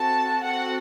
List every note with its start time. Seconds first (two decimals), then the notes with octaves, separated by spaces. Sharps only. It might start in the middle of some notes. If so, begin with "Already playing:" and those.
Already playing: C4 F#4 A4 A5
0.44 C4 F#4 A4 F#5